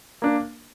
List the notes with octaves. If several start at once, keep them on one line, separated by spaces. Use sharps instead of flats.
A#3 D4 A#4